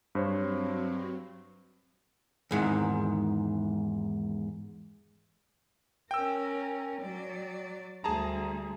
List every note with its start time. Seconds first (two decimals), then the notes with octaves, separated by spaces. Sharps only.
0.15 G2 F#3 C4 C5 C#5
2.51 E2 G#2 D#3
6.11 C#4 A#4 G5 E6
7.01 F#3 D5
8.04 D2 G3 G#4 A5 A#5